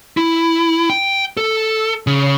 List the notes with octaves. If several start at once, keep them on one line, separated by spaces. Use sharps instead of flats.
E4
G5
A4
C#3